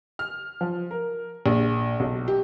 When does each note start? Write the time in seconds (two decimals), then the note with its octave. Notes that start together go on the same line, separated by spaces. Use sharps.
0.19 F6
0.61 F3
0.91 A#4
1.46 A#1
2.00 B1
2.28 G4